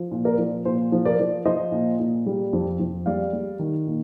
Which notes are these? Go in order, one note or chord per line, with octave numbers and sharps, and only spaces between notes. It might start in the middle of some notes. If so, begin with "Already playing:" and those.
Already playing: F3
A#2
A#4 D5
F3
A#2 C5
F3
A#4 D5
F3
F3 C5 D#5
A#2
A#2
G3
F2
F2
G3 D5 F5
G3
D#3
A#2